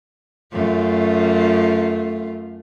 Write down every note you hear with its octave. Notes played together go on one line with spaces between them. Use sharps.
F#2 A3 F4